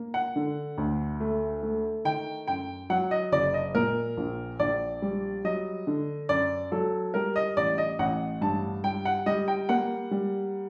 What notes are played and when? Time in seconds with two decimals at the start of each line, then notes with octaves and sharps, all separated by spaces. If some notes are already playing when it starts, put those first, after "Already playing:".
Already playing: A#3
0.14 F#5
0.36 D3
0.78 D2
1.20 A3
1.63 A3
2.05 D#3 G5
2.47 F#2 G5
2.90 F#3 F#5
3.11 D#5
3.32 F#1 D5
3.54 D#5
3.75 A#2 A#4
4.17 A#1
4.60 A#1 D5
5.02 G3
5.45 F#3 D#5
5.87 D3
6.29 F#2 D5
6.72 F#3 A4
7.14 G3 A#4
7.36 D#5
7.57 A1 D5
7.78 D#5
7.99 A1 F#5
8.41 G2 A5
8.84 G3 G5
9.05 F#5
9.26 G3 D#5
9.48 G5
9.69 A#3 F#5
10.11 G3